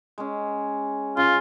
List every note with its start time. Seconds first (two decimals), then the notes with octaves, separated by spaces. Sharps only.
0.18 G#3 C#4
1.17 C#3 F4